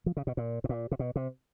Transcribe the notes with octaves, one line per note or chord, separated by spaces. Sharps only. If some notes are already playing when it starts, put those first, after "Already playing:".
F3
C#3
B2
A#2
A2
A#2
C3
B2
C3